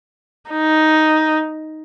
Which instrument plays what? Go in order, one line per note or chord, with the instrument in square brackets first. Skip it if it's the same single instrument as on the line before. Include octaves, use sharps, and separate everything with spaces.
[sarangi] D#4